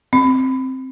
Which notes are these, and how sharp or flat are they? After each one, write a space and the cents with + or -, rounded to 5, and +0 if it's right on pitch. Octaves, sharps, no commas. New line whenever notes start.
C4 +0